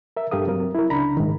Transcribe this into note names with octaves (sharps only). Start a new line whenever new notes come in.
A#4 E5
G2 G4 A4 A#4 F5 D#6
F#3 C4 A#4
E4 A#4
C#2 C#3 D4 A#5 B5
G#2 D#3